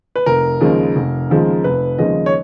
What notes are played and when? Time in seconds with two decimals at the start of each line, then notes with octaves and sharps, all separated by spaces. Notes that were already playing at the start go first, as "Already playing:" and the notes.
0.16 B4
0.26 F1 A#4
0.61 D#2 C#3 F3 G#3
0.96 F1
1.30 D#2 C#3 F3 G#3
1.64 F1 B4
1.99 D#2 C#3 F3 G#3 D#5
2.26 C#5